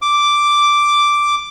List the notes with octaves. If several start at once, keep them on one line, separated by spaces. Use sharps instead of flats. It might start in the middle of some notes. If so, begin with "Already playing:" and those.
D6